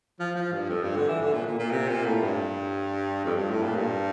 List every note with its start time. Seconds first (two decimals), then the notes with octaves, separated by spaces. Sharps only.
0.20 F3
0.36 F3
0.53 G2
0.70 F2
0.83 G2
0.96 D3
1.08 E3
1.21 D3
1.34 A#2
1.46 A#2
1.59 A#2
1.71 C3
1.89 A#2
2.06 A2
2.23 G2
3.25 F2
3.37 G2
3.50 A2
3.63 A#2
3.76 G2